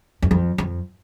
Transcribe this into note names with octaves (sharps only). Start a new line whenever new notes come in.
E2
F2
F2